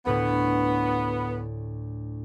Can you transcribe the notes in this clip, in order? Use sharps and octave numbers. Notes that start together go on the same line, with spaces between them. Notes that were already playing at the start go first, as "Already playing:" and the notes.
D2 A2 B3 C#5